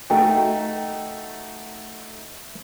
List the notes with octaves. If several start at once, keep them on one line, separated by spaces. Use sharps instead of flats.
A3 D#4 F#4 G5